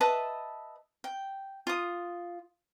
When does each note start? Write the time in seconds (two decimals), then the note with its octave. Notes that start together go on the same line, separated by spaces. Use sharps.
0.01 B4 D#5 E5 A5
1.04 G5
1.67 F4 D#6